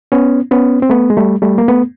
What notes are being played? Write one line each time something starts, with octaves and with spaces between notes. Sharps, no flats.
B3 C#4
B3 C#4
C4
A3 B3
G#3
G3 A3
G3 A3
A#3
A3 B3